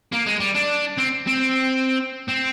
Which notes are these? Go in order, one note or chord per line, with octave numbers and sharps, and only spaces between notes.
A#3
G#3
G3
D4
C4
C4
C4